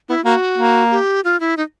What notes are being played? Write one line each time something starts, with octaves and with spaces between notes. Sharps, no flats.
B3 E4
A#3 F#4
A#3
G4
F4
E4
D#4